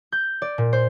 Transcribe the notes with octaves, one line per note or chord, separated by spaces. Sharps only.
G6
D5
A#2
C5